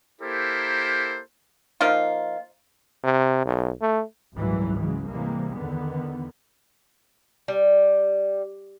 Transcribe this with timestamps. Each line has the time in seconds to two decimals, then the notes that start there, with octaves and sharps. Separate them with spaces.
0.21 A#3 E4 G4 A4 A#4 C5
1.81 F3 A#3 D#4 F4
3.04 C3
3.45 B1
3.82 A3
4.36 G#1 C#2 A#2 E3 F#3 G3
4.78 C#3 E3 F#3 G#3
5.08 C3 E3 G3 G#3 A#3
5.56 E2 D3 D#3 B3
7.48 G3